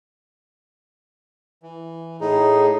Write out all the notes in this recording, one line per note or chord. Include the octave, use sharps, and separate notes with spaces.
E3
A2 D#4 G#4